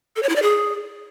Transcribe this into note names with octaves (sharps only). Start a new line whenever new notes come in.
A4
C#5
E4
D5
G#4